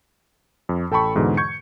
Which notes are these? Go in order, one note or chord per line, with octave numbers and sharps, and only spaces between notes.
F2
A1 A4 G5 A5 B5 C#6
E2 G#2 B2 D3 E3
C#6 G6 G#6 C#7